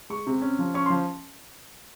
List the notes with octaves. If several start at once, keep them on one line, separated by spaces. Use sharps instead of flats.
G#3 C#6
C3
C#4
F3
C#4 C#6
C6
F3